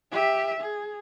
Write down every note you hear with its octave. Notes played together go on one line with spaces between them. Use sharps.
G4 E5
G#4